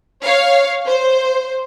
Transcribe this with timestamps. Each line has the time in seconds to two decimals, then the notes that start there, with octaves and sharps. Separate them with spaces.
0.24 C#5 F5
0.87 C5